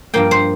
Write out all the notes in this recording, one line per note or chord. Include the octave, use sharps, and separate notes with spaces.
G2 F3 A#3 G5
C5